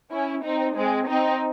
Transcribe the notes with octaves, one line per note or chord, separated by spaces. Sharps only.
C#4 E4
C4 D#4
G#3 C4
C4 D#4